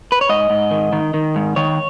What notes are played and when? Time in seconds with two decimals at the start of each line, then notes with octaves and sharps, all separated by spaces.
0.12 B4
0.21 C#5
0.29 G#2 D#5
0.50 G#2
0.71 D#3
0.93 D#3
1.14 D#3
1.36 G#2
1.56 D#3 C#5